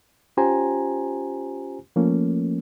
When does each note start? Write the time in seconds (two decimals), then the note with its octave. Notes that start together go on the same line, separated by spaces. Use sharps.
0.37 C#4 F4 G4 C5 G#5 A#5
1.96 F3 A3 A#3 C#4